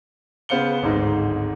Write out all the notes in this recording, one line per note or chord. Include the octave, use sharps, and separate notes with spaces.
C#3 B3 C5 F5 C#7 G7
D1 G#1 G#2 D#4